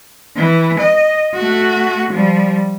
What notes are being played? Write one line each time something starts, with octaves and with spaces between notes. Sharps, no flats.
E3
D#5
A3 F#4
F3 G3